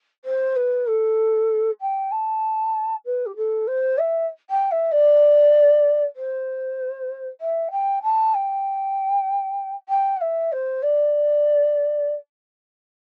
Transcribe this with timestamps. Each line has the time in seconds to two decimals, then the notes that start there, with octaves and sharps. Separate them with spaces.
0.25 C5
0.56 B4
0.87 A4
1.81 G5
2.11 A5
3.05 B4
3.26 G4
3.36 A4
3.67 C5
3.98 E5
4.50 G5
4.71 E5
4.92 D5
6.16 C5
7.41 E5
7.71 G5
8.03 A5
8.34 G5
9.89 G5
10.16 F#5
10.21 E5
10.52 C5
10.82 D5